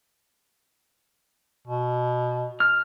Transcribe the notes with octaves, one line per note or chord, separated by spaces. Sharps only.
B2
F6